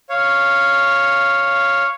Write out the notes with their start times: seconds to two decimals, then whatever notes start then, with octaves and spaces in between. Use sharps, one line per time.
0.09 C#5 F5